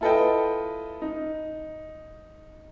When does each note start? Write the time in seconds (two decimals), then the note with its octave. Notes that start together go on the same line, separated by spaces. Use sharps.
0.01 E4 F4 A4 B4 D#5 G5
1.02 D#4